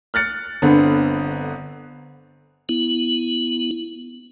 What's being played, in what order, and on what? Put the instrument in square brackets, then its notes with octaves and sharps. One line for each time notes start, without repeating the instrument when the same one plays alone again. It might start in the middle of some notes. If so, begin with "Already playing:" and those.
[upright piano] F6 F#6 A6 C#7
G1 D3 B3 C4
[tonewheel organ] B3 E4